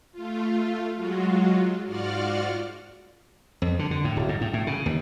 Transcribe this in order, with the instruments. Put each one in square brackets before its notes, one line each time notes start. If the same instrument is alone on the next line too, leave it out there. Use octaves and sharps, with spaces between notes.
[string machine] A3 F4
F#3 G#3 F4 F#4
G#2 F4 F#4 D5 F#5 F6
[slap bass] F2
D3
D3
A2
D1
G#2
A2
A2
C#3
D#2